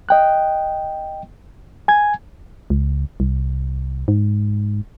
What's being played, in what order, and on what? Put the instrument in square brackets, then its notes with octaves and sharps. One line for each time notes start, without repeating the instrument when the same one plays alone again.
[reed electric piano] D#5 G5 F#6
G#5 G#6
[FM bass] C#2
C2
G#2